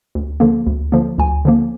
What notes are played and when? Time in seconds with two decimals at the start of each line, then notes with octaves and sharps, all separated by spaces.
0.15 D2
0.40 D3 F3 A#3
0.67 D2
0.92 D3 F3 A#3
1.18 D2 G#5
1.45 D3 F3 A#3